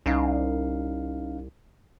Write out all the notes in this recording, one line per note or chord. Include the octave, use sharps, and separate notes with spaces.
C2 C#4 D#4 F5